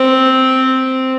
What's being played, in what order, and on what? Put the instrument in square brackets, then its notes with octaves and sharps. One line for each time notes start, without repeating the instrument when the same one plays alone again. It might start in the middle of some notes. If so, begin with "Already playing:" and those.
Already playing: [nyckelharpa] C4